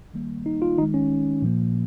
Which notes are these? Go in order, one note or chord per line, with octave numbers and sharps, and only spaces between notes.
D#3 G3 A#3
D#4
F4
D#3 G#3 D#4
C#4
A#2 F3 A#3